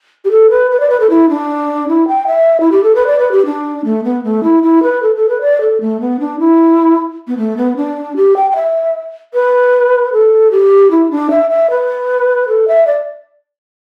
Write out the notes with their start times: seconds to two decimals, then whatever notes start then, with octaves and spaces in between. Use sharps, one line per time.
0.25 G4
0.31 A4
0.50 B4
0.71 B4
0.80 D5
0.90 B4
1.00 A4
1.10 E4
1.29 D4
1.88 E4
2.08 G5
2.27 E5
2.60 E4
2.72 G4
2.84 A4
2.95 B4
3.07 D5
3.19 B4
3.32 G4
3.46 D4
3.85 A3
4.04 B3
4.24 A3
4.43 E4
4.63 E4
4.83 B4
5.02 A4
5.16 A4
5.29 B4
5.41 D5
5.61 A4
5.81 A3
6.01 B3
6.20 D4
6.39 E4
7.28 B3
7.38 A3
7.57 B3
7.77 D4
8.16 G4
8.36 G5
8.52 G5
8.56 E5
9.34 B4
10.13 A4
10.51 G4
10.91 E4
11.11 D4
11.31 E5
11.50 E5
11.70 B4
12.48 A4
12.68 E5
12.87 D5